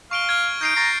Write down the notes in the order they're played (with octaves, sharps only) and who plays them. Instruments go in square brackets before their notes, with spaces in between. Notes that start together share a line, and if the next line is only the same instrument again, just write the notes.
[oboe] F5 [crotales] C#6 D7 G7
[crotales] F6 G#6
[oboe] D#4 [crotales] G6 C7 D7
[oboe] A#5 [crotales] C#6 A6 C7